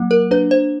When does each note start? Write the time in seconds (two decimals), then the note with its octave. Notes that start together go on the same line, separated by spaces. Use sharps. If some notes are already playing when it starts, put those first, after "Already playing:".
Already playing: F#3 A#3
0.11 A#4
0.31 D4 B4
0.51 C5